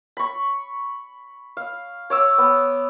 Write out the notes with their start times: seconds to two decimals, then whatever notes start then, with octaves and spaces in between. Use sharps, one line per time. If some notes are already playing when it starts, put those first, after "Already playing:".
0.17 B5 C#6
1.57 F5
2.10 C#5 D6 E6
2.38 B3